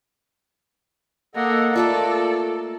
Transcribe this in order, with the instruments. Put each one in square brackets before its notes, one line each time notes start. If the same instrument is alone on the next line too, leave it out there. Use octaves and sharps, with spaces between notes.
[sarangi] A#3 [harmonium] A4 D#5 F#5
[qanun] A3 A#3 F4 [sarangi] A4 [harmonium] D5